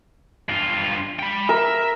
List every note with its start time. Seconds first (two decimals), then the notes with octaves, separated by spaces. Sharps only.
0.49 G2 F4
1.19 G5 B5
1.49 A#4 E5